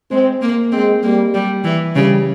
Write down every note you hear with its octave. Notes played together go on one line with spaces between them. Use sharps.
G#3 C4
A#3
G#3 C4
G3 A#3
G3
E3
C#3 G3